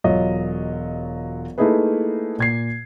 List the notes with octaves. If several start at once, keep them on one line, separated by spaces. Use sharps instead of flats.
E1 F#3 F4 C#5 D#5
A3 A#3 D#4 E4 G#4 B4
A#2 G#6 C7